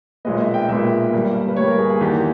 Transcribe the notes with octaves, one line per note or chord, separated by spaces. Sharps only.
B1 A#2 G#3 B3 D#5
E5
G5
B1 A#2 G#3 B3 E5
G1 G2 G3 A#3
B4
G1 G2 G3 A#3 C#5
A#4
G#4
G#4
E2 D#3 A#3 G4